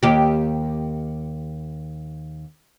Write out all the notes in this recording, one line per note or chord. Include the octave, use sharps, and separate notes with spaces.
D#2 G4